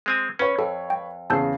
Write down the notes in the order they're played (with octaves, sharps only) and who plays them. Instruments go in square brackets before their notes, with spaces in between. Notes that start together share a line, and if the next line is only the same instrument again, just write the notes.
[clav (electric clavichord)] G#3 C4 G#5
[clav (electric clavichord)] C#4 [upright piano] B4 C#5
[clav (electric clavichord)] F2 [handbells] A4
[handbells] G5
[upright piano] E2 C#3 C7 [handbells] A5 E6 G6